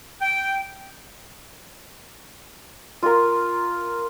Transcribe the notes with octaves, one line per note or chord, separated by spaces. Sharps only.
G5
F4 A#4